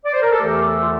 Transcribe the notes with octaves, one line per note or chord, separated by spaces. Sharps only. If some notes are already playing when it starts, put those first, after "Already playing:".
D5
C5
A#4
A4
E2 E3 A3 G4
A4
F4